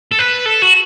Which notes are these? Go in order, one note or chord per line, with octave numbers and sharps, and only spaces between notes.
A4
B4
A4
F#4